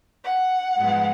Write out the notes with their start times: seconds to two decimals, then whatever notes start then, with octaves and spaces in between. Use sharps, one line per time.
0.23 F#5
0.77 G#2 F3 G#3 B3